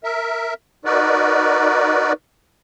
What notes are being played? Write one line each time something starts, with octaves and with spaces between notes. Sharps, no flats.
A#4 E5
D#4 F#4 A#4 B4 D5